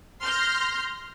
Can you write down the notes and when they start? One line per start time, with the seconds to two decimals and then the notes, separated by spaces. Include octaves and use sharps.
0.23 C6 F6 G6 A#6